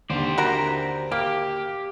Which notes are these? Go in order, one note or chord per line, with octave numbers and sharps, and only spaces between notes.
D#2 D3 G4 C5 D5
F#4 A#4 A#5
A#3 G4 F6